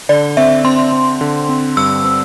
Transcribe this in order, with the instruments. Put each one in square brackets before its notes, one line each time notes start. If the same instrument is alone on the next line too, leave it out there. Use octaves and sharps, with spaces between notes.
[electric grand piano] D3 [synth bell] D5
[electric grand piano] C4 [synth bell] E5
[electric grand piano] C4 [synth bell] C6
[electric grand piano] C4
D3
C4
[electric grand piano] G2 [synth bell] E6
[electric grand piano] C4